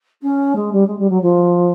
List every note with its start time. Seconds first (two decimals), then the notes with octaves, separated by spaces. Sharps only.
0.22 C#4
0.55 G#3
0.72 G3
0.86 G#3
0.98 G3
1.09 F#3
1.22 F3